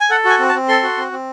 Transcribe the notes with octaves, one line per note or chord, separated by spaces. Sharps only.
G#5
A4 F#5
F#4 G#5
C4
A5
C4
A4 C6
F#4
C4
C4